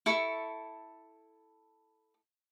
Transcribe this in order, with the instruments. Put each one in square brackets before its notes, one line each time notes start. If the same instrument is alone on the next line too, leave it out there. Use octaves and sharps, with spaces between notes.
[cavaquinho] E4 A4 C#6